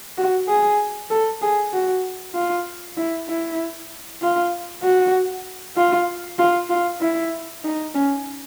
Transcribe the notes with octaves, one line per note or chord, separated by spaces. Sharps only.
F#4
G#4
A4
G#4
F#4
F4
E4
E4
F4
F#4
F4
F4
F4
E4
D#4
C#4